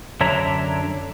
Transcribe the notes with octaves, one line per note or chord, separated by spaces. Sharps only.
F#2 D3 D4 C#5 E5 A#5